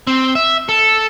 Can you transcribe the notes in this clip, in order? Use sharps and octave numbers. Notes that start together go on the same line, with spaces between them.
C4
E5
A4